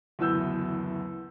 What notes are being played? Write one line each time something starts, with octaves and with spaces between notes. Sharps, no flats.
F#1 D2 E3 B3 E6 G6